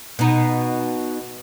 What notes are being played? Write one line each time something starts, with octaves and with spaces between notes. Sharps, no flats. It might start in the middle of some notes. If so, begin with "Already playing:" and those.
B2 D#4